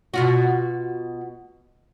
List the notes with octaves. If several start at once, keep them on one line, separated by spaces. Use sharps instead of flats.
B2 F4 F#4